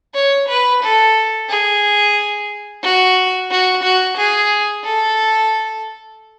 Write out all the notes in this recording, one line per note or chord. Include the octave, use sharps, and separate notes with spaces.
C#5
B4
A4
G#4
F#4
F#4
F#4
G#4
A4